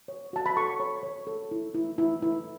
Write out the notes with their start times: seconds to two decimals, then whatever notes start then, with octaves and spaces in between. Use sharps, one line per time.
0.08 C#5
0.33 F#4 A5
0.46 B5
0.56 A4 C#6
0.80 C#5
1.03 C#5
1.27 A4
1.51 E4
1.75 E4
1.98 E4
2.22 E4